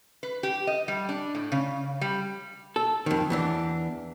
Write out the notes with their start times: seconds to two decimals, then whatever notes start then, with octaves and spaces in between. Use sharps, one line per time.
0.23 B4
0.43 G4
0.67 D#5
0.88 G3
1.09 D4
1.35 A2
1.52 C#3
2.01 G3
2.76 A4
3.06 F2 D#3
3.30 E2 E3 D4